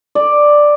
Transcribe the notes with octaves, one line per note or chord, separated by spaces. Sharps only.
D5